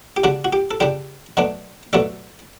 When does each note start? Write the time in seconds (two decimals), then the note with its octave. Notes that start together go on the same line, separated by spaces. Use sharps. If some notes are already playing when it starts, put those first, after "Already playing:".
0.17 G4
0.24 C#3 G3 D4 F#4
0.45 F#4
0.53 G4
0.71 A4
0.80 C#3 G3 D4 G4
1.37 B2 F#3 A3 D4
1.93 B2 F#3 A3 D4 A4